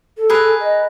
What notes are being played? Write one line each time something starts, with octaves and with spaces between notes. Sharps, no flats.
A4
G#4 A#4 B4
D#5